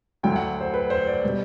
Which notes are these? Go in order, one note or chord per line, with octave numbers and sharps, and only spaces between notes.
D2 D3 F#3 G5
F#5
C5
B4
C5
D5
B2 G3